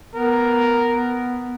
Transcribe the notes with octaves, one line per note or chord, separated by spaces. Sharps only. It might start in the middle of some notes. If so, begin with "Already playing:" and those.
B3 A#4
B3